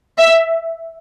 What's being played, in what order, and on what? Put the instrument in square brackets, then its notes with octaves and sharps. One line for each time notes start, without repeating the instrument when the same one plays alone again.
[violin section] E5